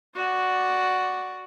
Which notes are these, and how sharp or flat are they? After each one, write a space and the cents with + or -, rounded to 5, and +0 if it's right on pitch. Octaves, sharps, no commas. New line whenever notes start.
F#4 +0 D5 +0